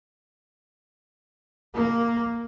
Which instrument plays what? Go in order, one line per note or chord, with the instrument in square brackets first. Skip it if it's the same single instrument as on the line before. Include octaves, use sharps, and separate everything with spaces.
[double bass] A#3